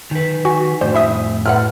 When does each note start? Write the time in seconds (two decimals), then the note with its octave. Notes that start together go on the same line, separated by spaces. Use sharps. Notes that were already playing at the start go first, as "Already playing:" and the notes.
0.11 D#3 B4
0.45 F#4 G#5
0.81 F2 A2 D4 C5
0.95 E4 E5 D#6
1.46 A2 E4 B4 F#5 F6